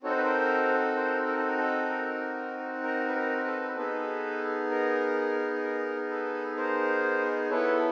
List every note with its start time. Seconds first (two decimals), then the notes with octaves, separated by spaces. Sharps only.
0.03 C4 D#4 F#4 A4 C#5
0.10 C5
0.17 B4
0.24 A#4 C5
0.96 A#4 C5
1.27 A#4
1.37 A4
1.48 A#4
1.58 A4
1.89 A#4
2.83 A#4
3.08 B4
3.15 A#4
3.45 A4 B4
3.76 B3 D#4 G#4 A4 B4
4.71 A#4
5.64 A#4
6.10 A4 B4
6.57 A#4 C5
7.50 B3 E4 A4 B4 C#5